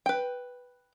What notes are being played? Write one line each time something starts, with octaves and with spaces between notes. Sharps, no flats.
B4 G5